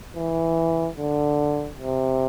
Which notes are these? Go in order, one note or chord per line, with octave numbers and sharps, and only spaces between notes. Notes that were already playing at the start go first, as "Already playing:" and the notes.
E3
D3
C3